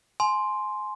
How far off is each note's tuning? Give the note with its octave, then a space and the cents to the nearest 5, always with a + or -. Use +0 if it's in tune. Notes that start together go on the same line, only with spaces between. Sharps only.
G#5 +25 C6 +0